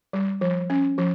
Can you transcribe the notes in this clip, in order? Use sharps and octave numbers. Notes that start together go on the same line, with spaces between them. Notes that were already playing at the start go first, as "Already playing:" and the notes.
G3
F3
C#4
F3